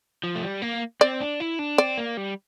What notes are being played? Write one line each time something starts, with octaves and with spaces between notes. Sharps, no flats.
F3
A3
G3
A#3
C4 D5
D4
E4
D4
C4 D5
A#3
G3